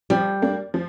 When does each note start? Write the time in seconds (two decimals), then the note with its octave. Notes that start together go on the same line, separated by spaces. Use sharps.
0.10 F3 G3
0.42 A#3 D4
0.74 F3